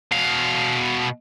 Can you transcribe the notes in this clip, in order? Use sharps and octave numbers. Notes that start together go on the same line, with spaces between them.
B2 F5